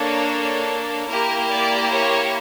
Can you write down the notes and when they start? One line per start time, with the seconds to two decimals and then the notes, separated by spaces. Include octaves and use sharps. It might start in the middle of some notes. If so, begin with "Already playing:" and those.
Already playing: A#3 D4 A4 C#5
1.07 A#3 E4 G4 A#4
1.50 D5
1.90 C#5